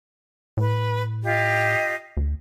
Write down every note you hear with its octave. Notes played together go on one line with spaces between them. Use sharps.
A2 B4
F4 G4 D#5
D2